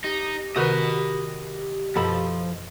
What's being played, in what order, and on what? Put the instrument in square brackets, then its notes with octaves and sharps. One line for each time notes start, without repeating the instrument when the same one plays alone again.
[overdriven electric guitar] D#4 [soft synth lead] G4
[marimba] C3 D#3 [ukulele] F#4 A#4 B4 [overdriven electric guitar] D#5 B5
[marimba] F#2 B2 [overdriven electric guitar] F3 [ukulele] A4 D#5 B5